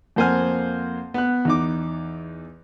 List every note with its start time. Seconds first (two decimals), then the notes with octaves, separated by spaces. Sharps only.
0.16 F2 A#3 C5 F#5 G#5 F6
1.14 B3 F#6
1.45 E2 D#4 D6